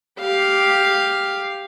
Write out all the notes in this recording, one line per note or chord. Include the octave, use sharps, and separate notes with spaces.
G4 F5